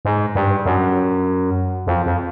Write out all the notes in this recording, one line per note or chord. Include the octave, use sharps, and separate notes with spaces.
G#2
G2
F#2
F2
F2